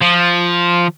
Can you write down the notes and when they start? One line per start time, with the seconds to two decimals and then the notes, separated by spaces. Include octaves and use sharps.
0.01 F3